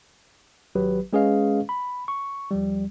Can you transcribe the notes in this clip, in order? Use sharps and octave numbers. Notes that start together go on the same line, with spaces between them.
G#1 F#3 G4 B4
G#3 C#4 G#4 B4 D#5 F5
B5
C#6
D#2 F3 G3